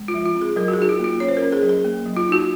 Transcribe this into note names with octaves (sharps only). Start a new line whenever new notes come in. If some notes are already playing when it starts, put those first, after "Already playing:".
Already playing: G#3
F4
F3
F4
C4
G#4
F#3 A#4
F#4
G#4
D#4 F#4
F4
A#3 F4
C#4 C#5
C5
A#4
C#4
G#4
F#3
G#4
A#3
F#3
F4
D#4 F#4